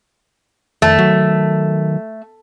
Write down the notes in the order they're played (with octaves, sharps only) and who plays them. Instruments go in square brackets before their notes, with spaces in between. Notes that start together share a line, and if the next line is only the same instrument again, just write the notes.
[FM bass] F2 [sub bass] D#3 [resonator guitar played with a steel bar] A3
[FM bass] F#3